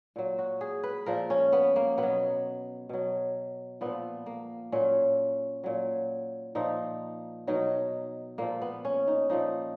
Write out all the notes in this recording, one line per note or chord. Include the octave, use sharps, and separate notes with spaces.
A#2 F#3
F#4
G#4
B4
A#2 F3 A#4
C#4
B3
A#3
B2 B3
F#3
B2 F#3
A#2 F3 B3
A#3
A#2 F#3 C#4
A#2 F#3
A#2 F3 D#4
B2 F#3 D#4
A#2 F3 A#3
B3
C#4
D#4
A#2 F3 D#4